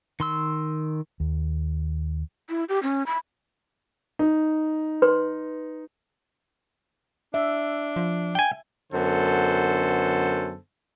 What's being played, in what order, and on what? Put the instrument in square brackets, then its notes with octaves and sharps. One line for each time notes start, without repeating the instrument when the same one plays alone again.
[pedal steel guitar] D#3 C6 E6
[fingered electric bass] D#2
[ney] E4
G4
C#4
B5
[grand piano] D#4
[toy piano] B4 C6
[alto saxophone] D4 [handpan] E5
[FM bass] F3
[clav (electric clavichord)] G5 G#5
[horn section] F#2 D3 B3 A4 C5